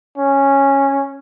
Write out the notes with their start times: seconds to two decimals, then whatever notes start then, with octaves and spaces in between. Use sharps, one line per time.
0.18 C#4